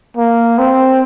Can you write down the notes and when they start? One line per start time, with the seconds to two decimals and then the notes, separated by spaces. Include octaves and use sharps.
0.17 A#3
0.59 C4